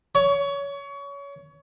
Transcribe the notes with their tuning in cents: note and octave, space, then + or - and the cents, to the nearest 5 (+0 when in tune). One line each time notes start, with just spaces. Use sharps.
C#5 +25